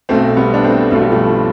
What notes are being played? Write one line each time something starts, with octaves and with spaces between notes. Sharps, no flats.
B1 B2 A3 C4
G3 B3
D4
A3 C4
B1 B2 A3
G3
F3 A3